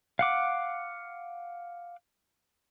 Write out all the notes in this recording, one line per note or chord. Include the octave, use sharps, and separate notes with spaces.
F5 F#5 D6